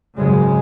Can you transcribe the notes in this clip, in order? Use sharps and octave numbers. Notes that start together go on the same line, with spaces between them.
G#1 F#2 C#3 G#3